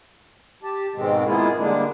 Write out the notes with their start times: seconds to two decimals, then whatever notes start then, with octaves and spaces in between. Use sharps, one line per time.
0.63 G4 A5
0.95 G#2 B2 D#3 G#3 C4
1.26 G#3 A#3 B3 E4 F4 G#4
1.58 G2 D3 G#3 A#3 D4